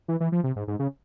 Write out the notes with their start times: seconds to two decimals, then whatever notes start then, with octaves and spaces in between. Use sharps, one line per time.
0.08 E3
0.20 E3
0.32 F3
0.44 C3
0.56 G#2
0.68 G#2
0.79 C#3